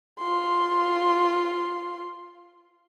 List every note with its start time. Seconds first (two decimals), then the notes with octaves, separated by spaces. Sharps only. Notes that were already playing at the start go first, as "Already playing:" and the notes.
0.19 F4 C6